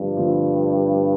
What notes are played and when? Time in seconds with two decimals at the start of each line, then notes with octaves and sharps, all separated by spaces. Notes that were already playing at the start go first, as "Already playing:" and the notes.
Already playing: G2 D3 F3 A3 C4
0.17 D3 F3 A3 C4 F4